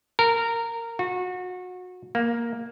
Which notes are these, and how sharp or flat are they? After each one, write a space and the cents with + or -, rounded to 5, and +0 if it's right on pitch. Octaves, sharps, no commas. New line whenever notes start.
A#4 -15
F#4 -25
A#3 +5